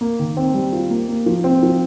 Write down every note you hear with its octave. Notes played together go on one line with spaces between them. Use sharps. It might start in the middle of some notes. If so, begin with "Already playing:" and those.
A#3
D#3
C4
G3
F4
A#3
A#3
F3
C4
F3